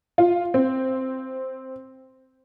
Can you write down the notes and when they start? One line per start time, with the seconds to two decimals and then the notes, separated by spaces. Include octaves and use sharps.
0.18 F4
0.54 C4